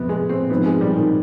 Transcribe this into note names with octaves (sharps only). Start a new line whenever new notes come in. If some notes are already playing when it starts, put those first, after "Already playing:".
Already playing: F1 C3 B3
G#3
C4
G#2 F3 B3 C4 D#4
G#3
G3
D#3